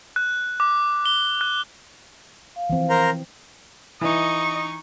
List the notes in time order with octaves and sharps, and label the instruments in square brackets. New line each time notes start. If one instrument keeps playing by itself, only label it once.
[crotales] F#6
D6
G7
F#6
[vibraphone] F5
[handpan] E3 F3 C4
[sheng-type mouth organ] A#4 C5 A#5
[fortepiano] E3 [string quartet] D#4 C#6 [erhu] D#5